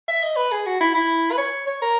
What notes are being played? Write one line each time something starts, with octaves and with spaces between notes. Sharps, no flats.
E5
D#5
B4
G#4
F#4
E4
E4
B4
C#5
C#5
A#4